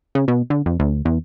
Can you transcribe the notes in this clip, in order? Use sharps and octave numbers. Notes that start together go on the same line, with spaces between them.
C#3
B2
D3
F2
D2
E2